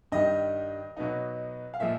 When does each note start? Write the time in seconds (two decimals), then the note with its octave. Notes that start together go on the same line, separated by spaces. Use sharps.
0.12 G2 D#3 G3 D#5
0.97 B2 F#3 B3 D#4
1.74 F5
1.80 A#2 F3 G#3 E5